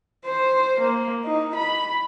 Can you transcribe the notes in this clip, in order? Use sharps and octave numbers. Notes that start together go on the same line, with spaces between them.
C5
A#3
D#4
B5